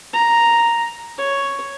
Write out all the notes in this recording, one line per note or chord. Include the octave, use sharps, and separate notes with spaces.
A#5
C#5